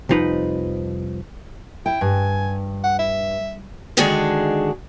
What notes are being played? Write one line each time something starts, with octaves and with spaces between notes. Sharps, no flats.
C2 F2 F3 D#4 B4
E4 G5
G2 G#5
F#5
E5
D3 D#3 G#3 D4 F#4 G#4